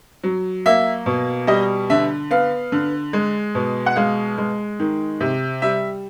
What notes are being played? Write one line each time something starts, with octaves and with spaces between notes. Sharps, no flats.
F#3
A#3 E5
B2
G3 D#5
D3 E5
B3 F5
D3
G#3
B2
F#5
G#3 F5
G#3
D#3
C3
G3 E5